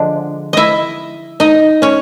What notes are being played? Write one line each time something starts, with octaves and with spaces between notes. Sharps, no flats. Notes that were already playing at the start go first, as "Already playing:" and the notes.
Already playing: D3 F3 G#3 D4
E4 D#5 E5
D#4 D#5
C#4 C#5